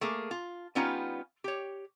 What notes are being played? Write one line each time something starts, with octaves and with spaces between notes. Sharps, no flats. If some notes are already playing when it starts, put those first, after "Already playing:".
A3 A#3 G#4
F4
G3 B3 C#4 D#4 F4
G4 C#5